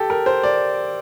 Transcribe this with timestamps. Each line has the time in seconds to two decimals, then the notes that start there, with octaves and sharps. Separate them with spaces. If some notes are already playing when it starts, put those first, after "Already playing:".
Already playing: G4 A4
0.10 A#4
0.26 C5
0.43 D5